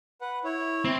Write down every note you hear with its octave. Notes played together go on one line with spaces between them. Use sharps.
B4 F#5
E4 C#5
C4